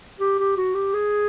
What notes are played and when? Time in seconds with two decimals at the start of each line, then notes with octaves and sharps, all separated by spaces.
0.20 G4
0.39 G4
0.57 F#4
0.75 G4
0.94 G#4